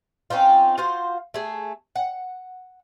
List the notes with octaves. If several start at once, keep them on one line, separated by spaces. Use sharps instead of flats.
C4 C#4 D#4 F4
F4 F#4 C5 F5
A3 G#4
F#5